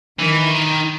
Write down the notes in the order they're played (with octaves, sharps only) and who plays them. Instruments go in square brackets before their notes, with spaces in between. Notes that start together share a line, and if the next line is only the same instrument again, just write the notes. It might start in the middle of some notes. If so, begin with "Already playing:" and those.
[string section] D#3 [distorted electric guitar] E3
[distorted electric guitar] D#3